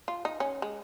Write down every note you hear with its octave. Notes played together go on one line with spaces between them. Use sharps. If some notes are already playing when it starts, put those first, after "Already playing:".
F4
D#4
C#4
G#3